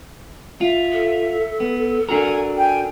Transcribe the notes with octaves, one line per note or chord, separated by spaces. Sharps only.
F4 E5
A4
B3
D4 F#4 A#4 G#5
G5 G#5